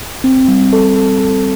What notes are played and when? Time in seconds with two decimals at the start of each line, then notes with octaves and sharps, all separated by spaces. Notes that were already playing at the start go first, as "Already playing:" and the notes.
0.24 C4
0.48 G3
0.73 A4
0.96 A4
1.20 A4